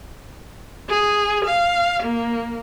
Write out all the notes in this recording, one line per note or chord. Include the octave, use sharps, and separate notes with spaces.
G#4
F5
A#3